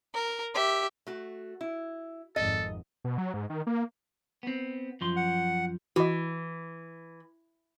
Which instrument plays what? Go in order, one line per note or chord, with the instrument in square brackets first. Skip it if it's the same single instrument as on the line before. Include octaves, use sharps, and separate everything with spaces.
[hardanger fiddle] A#4
G4 E5
[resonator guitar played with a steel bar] A3 F#4
E4
[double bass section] G#1 F2 G#2 [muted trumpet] A4 [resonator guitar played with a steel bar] D#5
[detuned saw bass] B2
F#3
G#2
D#3
A#3
[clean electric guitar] B3 C4
F#2 F3 C6
[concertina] F#5
[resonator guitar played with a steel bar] E3 [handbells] F#4 D#5